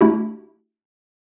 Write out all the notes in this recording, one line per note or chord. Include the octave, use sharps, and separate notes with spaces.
A3 D4 E4 F#4 G4